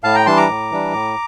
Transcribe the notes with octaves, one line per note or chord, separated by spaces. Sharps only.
A2 F5 A5
G5 A#5
E3 G3 D4 A5 C6
A#5 D6
A2
E3 G3 D4
A2